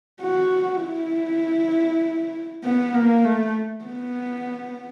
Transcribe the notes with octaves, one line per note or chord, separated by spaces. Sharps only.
F#4
E4
B3
A#3
A3
B3